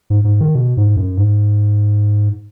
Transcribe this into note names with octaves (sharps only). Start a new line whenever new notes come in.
G#2
G#2
D#3
B2
G#2
F#2
G#2